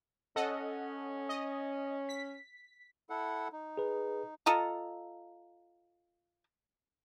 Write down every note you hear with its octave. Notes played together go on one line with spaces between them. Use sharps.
C#4 A4 D#5 F#5
D#5
B6
E4 A4 F#5
D#4
G#4 B4
F4 A4 D#5 A#5